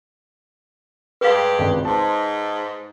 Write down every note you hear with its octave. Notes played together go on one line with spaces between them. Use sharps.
G2 G#3 G4 B4 F5
G#1 C#2
G#2 A5 C6